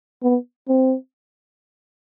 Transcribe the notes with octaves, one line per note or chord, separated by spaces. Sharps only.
B3
C4